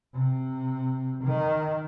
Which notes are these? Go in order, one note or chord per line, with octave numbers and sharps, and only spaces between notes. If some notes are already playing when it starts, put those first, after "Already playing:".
C3
D#3